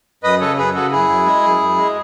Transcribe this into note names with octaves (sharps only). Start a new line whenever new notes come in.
F#2 B4 D#5
C#3 A4 C#5
F#2 G#4 B4
C#3 F#4 A4
F#2 E4 G#4
F#2
G#3
F#2
F#2
G#3